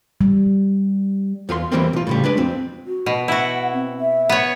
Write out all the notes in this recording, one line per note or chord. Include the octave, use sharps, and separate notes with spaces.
G3
E2 F4 G4 C6
E2 G2 E3 G3 A#3 C4
B1 F4
A2 C#3 G3
G#3 D4 B4
F2 C4
F#4
B2
E4 F#4 F#5
C4
E5
B3 C#5